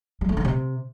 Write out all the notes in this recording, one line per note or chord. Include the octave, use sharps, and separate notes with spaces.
G3
A3
D3
C3